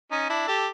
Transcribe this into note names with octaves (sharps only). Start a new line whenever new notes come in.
C#4 D#4
D4 E4
G4 A4